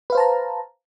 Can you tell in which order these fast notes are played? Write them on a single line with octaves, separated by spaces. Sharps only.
B4 F5 C5 A5 A#5